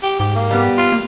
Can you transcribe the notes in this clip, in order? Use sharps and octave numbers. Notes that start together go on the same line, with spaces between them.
G4
G#2 G4
A#3
G3 B3 G4
F4
A#3